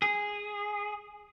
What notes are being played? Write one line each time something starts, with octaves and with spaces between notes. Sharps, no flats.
G#4